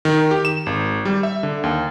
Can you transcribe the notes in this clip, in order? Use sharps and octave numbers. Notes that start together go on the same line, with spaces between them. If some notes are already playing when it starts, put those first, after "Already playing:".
D#3
G4
E7
G#1
G3
E5
D3
D#2